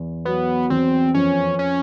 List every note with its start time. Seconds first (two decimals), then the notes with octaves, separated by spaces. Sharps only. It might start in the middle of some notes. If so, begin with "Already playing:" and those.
Already playing: E2
0.25 F#3 B3
0.70 E2 C4
1.14 F2 C#4
1.59 C#4